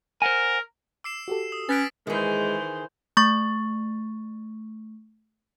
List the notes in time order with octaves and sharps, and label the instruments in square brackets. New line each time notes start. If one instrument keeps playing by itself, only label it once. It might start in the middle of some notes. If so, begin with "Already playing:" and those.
[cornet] A#4 [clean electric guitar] C5 F#5 G#5
[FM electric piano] D6 [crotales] E6 C7 E7
[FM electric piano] F#4 G4 A4
[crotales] D#6
[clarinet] C#4 [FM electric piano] B4 F#6 [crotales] A6 B6 D7
[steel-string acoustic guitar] D#3 G#4 [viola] E3 C5 [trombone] G#3
[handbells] A3 C#6 A6